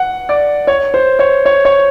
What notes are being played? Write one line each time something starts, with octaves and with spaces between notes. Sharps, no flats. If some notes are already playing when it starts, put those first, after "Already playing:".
Already playing: F#5
D5
C#5
C5
C#5
C#5
C#5